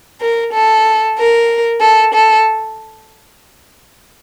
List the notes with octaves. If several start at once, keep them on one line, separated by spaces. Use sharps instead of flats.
A#4
A4
A#4
A4
A4